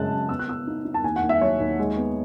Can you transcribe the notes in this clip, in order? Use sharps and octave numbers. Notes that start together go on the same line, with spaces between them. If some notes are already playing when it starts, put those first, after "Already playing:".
Already playing: F#2 C#3 G#3 A5 F#6
F#2
B3 E6
F#6
B3 E6
D#4
D#4
A5
D#2 G#5
F#5
D#2
E5
F#3 C#5
D#2
G#3
B3